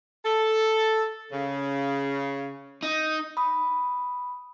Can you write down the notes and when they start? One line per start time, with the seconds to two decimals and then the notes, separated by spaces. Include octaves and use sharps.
0.25 A4
1.32 C#3
2.83 D#4
3.37 B5 D#6